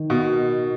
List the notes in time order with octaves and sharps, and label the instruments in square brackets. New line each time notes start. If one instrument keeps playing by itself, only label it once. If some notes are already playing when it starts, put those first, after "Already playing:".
Already playing: [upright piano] D#3
[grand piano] B2